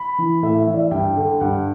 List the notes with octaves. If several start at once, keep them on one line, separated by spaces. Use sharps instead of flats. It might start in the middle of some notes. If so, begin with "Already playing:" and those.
Already playing: B5
E3
A2 E5
E5
E3 E5
D5
E5
G2 G5
D3
G2 F#5